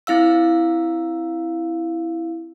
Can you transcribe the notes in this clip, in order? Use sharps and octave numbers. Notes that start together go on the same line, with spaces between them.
C4 E4 F5 E6